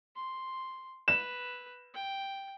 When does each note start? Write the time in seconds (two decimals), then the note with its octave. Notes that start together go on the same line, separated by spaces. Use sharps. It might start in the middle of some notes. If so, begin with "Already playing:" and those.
0.16 C6
1.08 B4 E7
1.94 G5